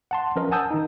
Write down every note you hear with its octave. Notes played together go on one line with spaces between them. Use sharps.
F#5 A5 C6
F3 C#4 A#4 B4 D#5
F#5 G#5 A5 D#6 E6 G6
D#3 D#4